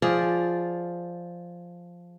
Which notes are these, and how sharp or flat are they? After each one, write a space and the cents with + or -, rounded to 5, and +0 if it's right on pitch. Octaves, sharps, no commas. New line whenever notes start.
F3 +0 G#4 +0 D5 +0